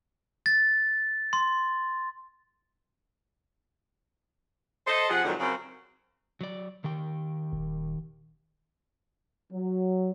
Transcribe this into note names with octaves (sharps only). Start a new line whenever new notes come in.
A6
C6
A4 C5 D#5
C3 F3 G#4 F#5
F2 G#2 D3 D#3 F3 F#3
F#2 C#3 C4
F#3 D5
D#3 G4 G5
D#1
F#3